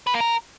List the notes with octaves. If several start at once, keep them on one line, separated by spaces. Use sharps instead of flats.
B4
A#3
A#4